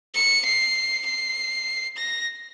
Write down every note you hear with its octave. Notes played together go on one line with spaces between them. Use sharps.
C#7
C7
C7
A#6